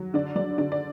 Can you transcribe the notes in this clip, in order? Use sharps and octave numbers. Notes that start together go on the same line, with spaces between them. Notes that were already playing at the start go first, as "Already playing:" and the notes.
Already playing: F#3
D3 D5
F#3 D5
D3 D5
D5